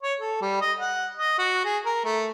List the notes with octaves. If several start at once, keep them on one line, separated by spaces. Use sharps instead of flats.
C#5
A4
G3
D#5
F#5
D#5
F#4
G#4
A#4
A3